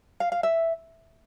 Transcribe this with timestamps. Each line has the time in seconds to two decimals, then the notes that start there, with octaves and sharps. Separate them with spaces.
0.20 F5
0.32 F5
0.43 E5